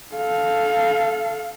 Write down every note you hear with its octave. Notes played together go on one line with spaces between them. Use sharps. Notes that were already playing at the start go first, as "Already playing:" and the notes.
A4 F5